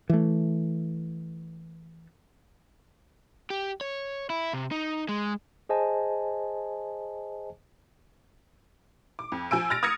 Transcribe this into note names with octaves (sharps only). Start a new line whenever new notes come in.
E3 A3
G4
C#5
E4
C3
D#4
G#3
G#4 C5 D#5 G#5 A5
D6
F2
F3 G#5 E6 D7
F6 A6 A#6 D7
D#6 F6 G#6 A#6 C#7